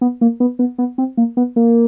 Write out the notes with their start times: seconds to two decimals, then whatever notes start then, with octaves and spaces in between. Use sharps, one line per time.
0.01 B3
0.21 A#3
0.40 B3
0.59 B3
0.78 B3
0.98 C4
1.17 A#3
1.37 B3
1.56 A#3